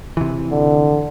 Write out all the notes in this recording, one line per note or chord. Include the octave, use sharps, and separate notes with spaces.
C3 E3
D3